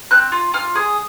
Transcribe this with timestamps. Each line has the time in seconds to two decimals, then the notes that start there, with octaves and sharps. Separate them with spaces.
0.11 C4 F#6
0.32 F4
0.54 F4 F6
0.75 G#4 D#6